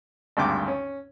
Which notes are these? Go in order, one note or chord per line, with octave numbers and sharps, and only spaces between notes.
G#1 D2 G2 G5 D6
C#4